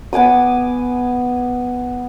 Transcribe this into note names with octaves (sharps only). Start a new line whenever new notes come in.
B3 G#5 D6 D#6